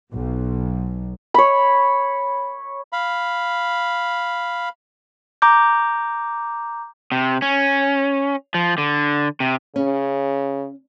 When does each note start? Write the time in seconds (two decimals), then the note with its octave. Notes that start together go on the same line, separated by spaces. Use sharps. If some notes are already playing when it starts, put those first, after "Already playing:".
0.13 B1
1.34 C#5 B5
2.93 F5 B5
5.42 A#5 D6 G6
7.12 C3
7.42 C#4
8.54 F3
8.78 D3
9.40 C3
9.76 C#3 C#4